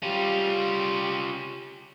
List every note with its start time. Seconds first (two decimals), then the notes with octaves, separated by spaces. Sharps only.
0.03 G3 C#4 F4 G4